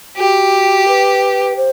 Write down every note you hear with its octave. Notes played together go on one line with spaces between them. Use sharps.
F#4 G4
B4
C5